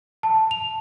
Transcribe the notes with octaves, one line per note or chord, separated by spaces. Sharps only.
A5
F7